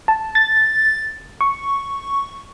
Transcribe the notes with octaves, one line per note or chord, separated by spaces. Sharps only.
A5
A6
C#6